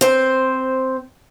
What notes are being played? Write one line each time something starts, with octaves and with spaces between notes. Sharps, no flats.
C4 C5